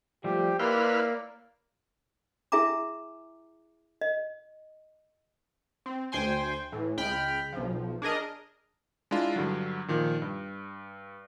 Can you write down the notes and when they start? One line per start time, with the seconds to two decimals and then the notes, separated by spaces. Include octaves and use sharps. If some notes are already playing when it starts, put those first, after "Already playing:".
0.24 F3 G3 A3 G4
0.59 A#3 E4 B4 C#5 D5 C6 F6
2.52 E4 G#4 E5 G#5 A#5 D6
4.01 D#5
5.86 C4
6.12 D2 C5 G5 G#5 C6
6.72 A2 E3
6.97 C#2 G#3 G5 B5 F6
7.53 B1 F3
8.02 D4 G#4 A#4 D#5
9.11 G#3 D4 E4 F4
9.36 G2 D3 F#3
9.88 A#2 D#3 F3
10.22 G2